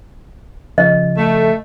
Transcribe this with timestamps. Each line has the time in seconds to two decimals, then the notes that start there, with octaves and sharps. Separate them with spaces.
0.78 C#3 F3 D#5
1.18 A3